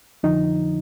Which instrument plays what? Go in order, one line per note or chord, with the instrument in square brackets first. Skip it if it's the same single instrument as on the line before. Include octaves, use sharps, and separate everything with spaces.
[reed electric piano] F2 D3 F3 D#4